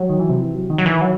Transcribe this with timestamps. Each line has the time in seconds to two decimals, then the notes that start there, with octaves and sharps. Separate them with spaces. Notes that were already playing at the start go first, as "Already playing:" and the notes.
Already playing: F#3
0.09 D#3
0.20 E3
0.29 C3
0.40 E3
0.55 F#3
0.70 D#3
0.78 F#3
0.86 E3
1.01 F#3